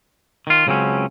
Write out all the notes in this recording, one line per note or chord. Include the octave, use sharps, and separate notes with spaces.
D#3 F4
C#2 C#3 F#3 C4 C#4